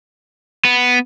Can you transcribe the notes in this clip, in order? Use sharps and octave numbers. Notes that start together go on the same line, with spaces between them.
B3